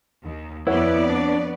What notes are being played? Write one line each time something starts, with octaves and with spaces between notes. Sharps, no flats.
D#2
F2 B3 E4 B4 C#5 D5 F#5
D4